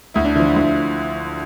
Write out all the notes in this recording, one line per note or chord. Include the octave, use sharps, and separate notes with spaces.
D2 E4
D4
D3 F3 E4
E4
D2 E4